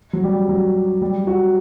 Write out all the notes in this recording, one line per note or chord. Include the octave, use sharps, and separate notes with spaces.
F#3
G3
F#3
G3
F#4